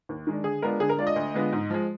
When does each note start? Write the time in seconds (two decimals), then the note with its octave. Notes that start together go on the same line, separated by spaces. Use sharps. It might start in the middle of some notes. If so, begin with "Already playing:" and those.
0.09 D#2
0.27 D#3 G#3 D4
0.44 D3 G#4
0.62 G#3 B3 D4 F4 A#4
0.80 D3 G#4
0.89 A#4
0.98 G#3 D4 F4 D5
1.07 D#5
1.16 D2
1.34 D3 G#3 B3 F4
1.53 G#2
1.70 F3 G#3